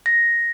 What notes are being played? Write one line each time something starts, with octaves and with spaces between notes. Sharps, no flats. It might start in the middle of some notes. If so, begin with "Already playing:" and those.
A#6